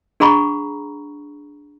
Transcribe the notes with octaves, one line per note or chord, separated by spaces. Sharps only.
D4 G#4 F#5 A#5 B5 C#6